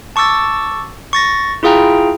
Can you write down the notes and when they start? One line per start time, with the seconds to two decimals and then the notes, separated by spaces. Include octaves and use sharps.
0.16 A5 C#6 D6 E6 A6
1.13 C#6 A6 A#6
1.63 E4 F4 G#4 F5 G5 A#5